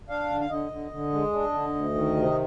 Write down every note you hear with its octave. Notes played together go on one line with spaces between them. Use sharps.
D4 F5
D3
F5
D3 D#5
D3
D3
G#3
D4
D3
D2
D#3
C3